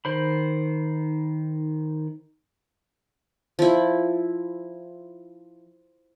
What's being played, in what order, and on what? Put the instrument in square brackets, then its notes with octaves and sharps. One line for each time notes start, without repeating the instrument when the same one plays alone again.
[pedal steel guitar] D#3 C5 B5
[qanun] F3 E4